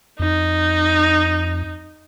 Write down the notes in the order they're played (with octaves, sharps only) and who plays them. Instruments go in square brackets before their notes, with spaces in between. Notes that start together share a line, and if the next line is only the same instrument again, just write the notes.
[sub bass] F2 [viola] D#4